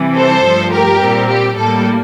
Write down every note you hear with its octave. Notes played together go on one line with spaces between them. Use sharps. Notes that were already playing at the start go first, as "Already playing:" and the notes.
Already playing: C3 E3 G3
A4 C5
G2 F3 A3
G4 A#4
A#2 G3 C4
G4
A2 G3 A#3 A4